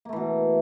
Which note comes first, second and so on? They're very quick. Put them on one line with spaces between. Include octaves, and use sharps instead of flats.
A#3 A3 E3 B2